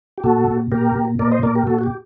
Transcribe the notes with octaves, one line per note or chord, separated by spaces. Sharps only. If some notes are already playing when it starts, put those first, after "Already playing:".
G4
A#2 F#4 A4
A#2
A#2 G4 A#4
A#2
A#2 A#4 D5
C5 D#5
A#2 A#4 D5
G4 A#4
A#2 F#4 A4
F#4
G4